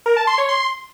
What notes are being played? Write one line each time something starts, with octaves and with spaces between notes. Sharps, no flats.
A#4
A5
C6
C#5
C6